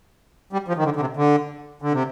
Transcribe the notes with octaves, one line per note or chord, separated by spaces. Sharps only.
G3
F3
D#3
D3
D3
C3
D3
D3
C3